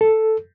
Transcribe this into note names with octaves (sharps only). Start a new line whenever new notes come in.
A4